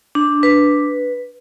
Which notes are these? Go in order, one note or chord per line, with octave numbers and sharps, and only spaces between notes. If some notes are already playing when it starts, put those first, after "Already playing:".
D4
B4